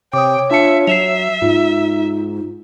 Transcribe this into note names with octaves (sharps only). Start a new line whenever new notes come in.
C3 C#5 G5 D6 D#6
D4 F4 E5 A5 C#7
F#3 E5 C7 E7 F7
G#2 D#4 F4